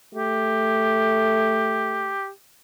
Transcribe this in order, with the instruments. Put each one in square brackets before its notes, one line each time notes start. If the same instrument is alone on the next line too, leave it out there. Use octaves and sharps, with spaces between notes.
[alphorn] A3 [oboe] G4